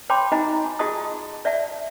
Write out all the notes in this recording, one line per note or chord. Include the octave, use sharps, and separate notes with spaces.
C#5 G5 A5 B5 C6 D6
D#4 F#4 D#5 G#5 A#5
F4 F#4 G#4 D#5 A5 D#6
D5 E5 F#5 A5